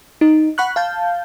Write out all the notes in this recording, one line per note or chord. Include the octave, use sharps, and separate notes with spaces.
D#4
F#5 B5 C#6 F#6
F5 A5 G6